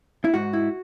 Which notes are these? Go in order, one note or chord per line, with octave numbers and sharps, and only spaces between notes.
E4
G#2 F#4
E4